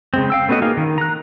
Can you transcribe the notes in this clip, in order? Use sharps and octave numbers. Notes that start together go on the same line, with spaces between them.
C#3 G#3 C4
F5 G5 E6
A3 B3 C#4 F#4 D#5
A#3 D#4 G#4 F5
D#3
A#5 F#6